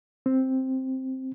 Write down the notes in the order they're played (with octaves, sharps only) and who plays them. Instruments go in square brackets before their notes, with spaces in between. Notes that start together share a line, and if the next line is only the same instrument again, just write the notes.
[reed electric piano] C4